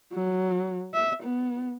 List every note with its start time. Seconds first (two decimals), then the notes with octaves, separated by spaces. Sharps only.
0.13 F#3
0.94 E5
1.23 B3